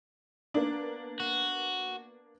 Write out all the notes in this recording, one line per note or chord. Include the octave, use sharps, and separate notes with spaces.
A#3 B3 D4
F#4